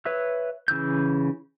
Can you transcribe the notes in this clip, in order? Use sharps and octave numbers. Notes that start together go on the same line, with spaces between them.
B4 C#5 E5 E6
C#3 E3 E6 G6